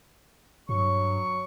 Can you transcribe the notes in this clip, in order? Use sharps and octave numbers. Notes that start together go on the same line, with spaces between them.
G2 F#3 C#6